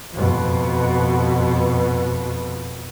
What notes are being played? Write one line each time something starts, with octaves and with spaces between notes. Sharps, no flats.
F2 B2